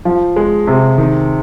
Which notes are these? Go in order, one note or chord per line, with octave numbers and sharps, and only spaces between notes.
F3
G#3
C3
D#3